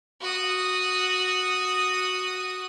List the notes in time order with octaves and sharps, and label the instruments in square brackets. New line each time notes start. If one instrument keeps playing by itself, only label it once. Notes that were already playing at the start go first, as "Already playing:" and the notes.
[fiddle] F#4 D#6